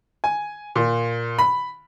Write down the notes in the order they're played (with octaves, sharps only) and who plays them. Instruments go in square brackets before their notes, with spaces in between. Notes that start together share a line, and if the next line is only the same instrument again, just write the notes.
[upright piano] G#5
A#2
B5